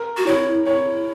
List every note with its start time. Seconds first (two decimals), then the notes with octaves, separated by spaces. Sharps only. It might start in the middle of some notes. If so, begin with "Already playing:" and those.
Already playing: A#4
0.17 F#4
0.27 E4 C#5
0.66 E4 C#5